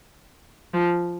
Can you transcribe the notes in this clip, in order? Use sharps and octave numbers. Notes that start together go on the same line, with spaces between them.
F3